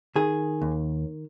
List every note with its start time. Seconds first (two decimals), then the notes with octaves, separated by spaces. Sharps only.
0.16 D#3 G#4
0.62 D#2